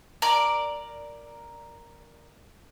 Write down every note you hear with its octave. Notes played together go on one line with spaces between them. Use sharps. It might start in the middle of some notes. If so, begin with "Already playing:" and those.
A#4 D5